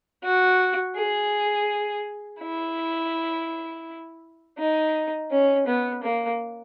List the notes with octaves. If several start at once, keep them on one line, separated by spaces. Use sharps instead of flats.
F#4
G#4
E4
D#4
C#4
B3
A#3